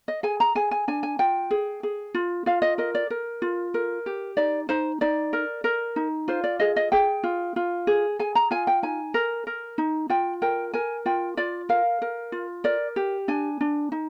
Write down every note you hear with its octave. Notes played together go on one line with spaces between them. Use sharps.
D#5
G#4 G#5
A#5
G#4 G#5
G#5
D4 G#5
G#5
F4 G5
G#4
G#4
F4
F4 F5
D#5
A#4 D#5
D5
A#4
F4
A#4
G4
D#4 D5
D#4 C5
D#4 D5
A#4
A#4
D#4
F4 C5
D5
G#4 D#5
D#5
G#4 G5
F4
F4
G#4
G#4 G#5
A#5
F4 G#5
G5
D#4 G#5
A#4
A#4
D#4
F4 G5
A#4 G5
A#4 G#5
F4 G5
F4 D5
A#4 F5
A#4
F4
A#4 D5
G4
D4 G#5
D4
D#4